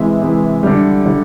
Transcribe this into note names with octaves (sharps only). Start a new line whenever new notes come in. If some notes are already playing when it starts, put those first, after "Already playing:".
Already playing: C3 E3 G#3 E5
C3 E3 G#3
D3 G3
D3 G3